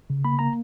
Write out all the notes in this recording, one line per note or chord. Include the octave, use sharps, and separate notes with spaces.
C#3
A#3 B5
A#3 A#5